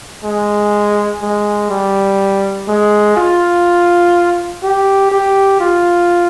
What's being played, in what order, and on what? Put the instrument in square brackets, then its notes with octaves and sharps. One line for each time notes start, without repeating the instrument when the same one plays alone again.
[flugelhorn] G#3
G#3
G3
G#3
F4
G4
G4
F4